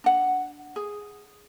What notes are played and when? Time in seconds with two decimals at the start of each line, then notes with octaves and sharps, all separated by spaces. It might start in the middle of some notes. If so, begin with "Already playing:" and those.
0.04 D4 F#5
0.76 G#4